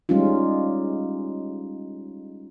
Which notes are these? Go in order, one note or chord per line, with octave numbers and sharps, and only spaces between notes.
G3 G#3 C#4 D#4 F4